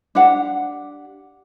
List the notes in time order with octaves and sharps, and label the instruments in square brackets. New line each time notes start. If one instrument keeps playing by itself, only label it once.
[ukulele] D4 G4 F5 F#5